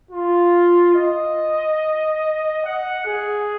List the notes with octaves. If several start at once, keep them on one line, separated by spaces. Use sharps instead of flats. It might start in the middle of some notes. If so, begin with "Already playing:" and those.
F4
D#5
F#5
G#4